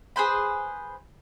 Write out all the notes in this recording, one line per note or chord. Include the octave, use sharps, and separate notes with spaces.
G#4 B4 C5 B5